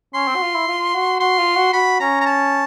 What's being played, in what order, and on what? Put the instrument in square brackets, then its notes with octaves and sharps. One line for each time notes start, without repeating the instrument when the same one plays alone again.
[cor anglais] C#4 [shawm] C6
[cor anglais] C4
F#4
F4
E4
F4
F#4
[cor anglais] F#4 [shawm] C6
[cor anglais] F4
F#4
[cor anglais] F#4 [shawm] B5
[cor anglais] C#4 [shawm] A#5
[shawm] A#5
A5